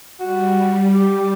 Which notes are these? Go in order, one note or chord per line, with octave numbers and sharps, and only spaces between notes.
G3 F#4
G4